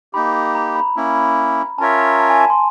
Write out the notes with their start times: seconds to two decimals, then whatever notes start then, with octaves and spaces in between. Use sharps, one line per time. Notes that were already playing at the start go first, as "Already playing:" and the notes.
0.13 A#3 D#4 G4 B5
0.55 A#5
0.76 B5
0.96 A#3 C#4 E4
1.78 C#4 F4 A#4 C#5 E5 A5
1.99 A#5
2.20 A5
2.30 G#5
2.40 A5
2.50 C6